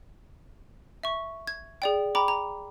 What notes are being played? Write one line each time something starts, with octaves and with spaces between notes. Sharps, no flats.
E5 C#6
G#6
G#4 D5 G5
G5 A#5 B5 D6
A#5